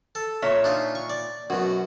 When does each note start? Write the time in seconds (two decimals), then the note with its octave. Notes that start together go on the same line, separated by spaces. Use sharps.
0.15 A4
0.42 A#2 C#5 E5
0.64 D4 D#4 F4
0.95 C#6
1.10 D5
1.50 F#2 B2 F#4